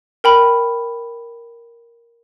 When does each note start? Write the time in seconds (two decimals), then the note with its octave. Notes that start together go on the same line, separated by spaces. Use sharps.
0.24 A#4 G5 B5